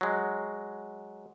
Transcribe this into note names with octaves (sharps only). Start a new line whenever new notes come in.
F#3 G#3